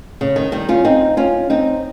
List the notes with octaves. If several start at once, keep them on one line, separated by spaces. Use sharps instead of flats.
C#3
D#3
D#3 G3
C#4 F4
C4 D#4
C#4 F4
C4 D#4